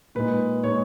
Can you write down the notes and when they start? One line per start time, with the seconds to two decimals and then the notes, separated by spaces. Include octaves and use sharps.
0.15 A#2 G#3 D#4 B4
0.64 A#2 G#3 D#4 C#5